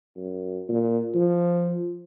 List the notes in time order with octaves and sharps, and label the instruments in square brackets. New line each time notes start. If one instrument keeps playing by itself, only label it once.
[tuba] F#2
A#2
F3